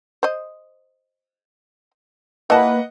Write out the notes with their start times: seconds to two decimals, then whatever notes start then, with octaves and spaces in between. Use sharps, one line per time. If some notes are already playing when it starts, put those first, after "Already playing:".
0.23 C5 D#5
2.50 E3 A#3 B4 D#5 F#5 A5